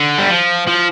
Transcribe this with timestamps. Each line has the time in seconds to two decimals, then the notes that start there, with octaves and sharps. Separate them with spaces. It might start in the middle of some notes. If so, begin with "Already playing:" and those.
Already playing: D3
0.18 G3
0.29 F3
0.67 F3